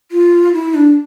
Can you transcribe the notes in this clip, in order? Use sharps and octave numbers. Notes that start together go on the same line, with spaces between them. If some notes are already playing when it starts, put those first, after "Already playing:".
F4
E4
D4